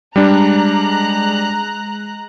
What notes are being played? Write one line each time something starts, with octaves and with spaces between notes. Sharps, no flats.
G3 G#3 D4 A#5 F#6